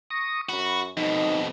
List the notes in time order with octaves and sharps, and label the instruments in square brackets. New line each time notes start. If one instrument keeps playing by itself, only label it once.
[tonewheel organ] C#6 D#6 A#6
[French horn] F#2 [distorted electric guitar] F#4 [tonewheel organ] B5
[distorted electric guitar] F2 B2 [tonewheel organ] D#4 [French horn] D#5